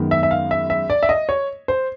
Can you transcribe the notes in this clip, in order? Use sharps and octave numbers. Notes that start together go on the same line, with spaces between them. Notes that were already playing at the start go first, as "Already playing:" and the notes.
Already playing: F#2 D#3 G#3 B3
E5
E5
F5
E5
E5
D5
E5
D#5
C#5
C5